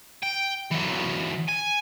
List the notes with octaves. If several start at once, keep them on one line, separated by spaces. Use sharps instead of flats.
G5
E3 F#3
G#5